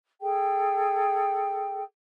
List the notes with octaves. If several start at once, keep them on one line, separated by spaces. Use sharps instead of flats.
G#4 A4 G5